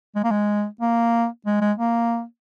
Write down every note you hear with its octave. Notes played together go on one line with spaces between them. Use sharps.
G#3
A#3
G#3
A#3
G#3
G#3
A#3